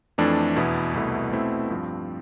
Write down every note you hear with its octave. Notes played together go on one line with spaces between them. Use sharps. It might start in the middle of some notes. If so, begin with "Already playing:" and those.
F2 E3 A3 D4
E2 B2 B3 E4
C2 B2 A3 E4
B2 A3 C4 E4
G2 F3 C4